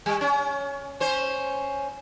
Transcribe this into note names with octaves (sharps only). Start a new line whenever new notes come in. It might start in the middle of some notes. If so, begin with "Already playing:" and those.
G3
C#4
C#4 C5